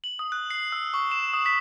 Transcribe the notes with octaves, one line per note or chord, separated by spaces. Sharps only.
F#7
D#6
F#6
C7
E6
C#6
E7
D#6
B6